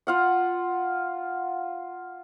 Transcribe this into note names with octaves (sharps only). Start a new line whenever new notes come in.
F4 F5 F#5